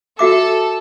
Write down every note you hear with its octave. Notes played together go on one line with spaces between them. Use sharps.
F#4 A4 E5 D6